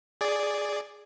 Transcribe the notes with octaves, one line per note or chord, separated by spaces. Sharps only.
G#4 D5